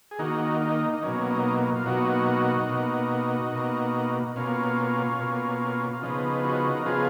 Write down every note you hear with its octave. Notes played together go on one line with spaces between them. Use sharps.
G#4
D#3 A#3 D#4 F#4
D#4
D#4
B2 F#3 A#3 C#4
D#4
F4
B2 F#3 A#3 D#4 F#4
B2 A#3
B2 A#3
B2 A#3 C#4 F4
B2 A#3
F4
C#3 F3 B3 D#4
D#4 F#4
A#4
C#3 F3 B3 F4 G#4